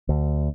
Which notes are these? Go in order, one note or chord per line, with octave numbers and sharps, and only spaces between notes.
D2